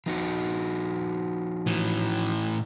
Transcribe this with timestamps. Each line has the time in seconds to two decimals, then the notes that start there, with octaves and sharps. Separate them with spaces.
0.06 F3 D#4 F#4
1.67 A2 E3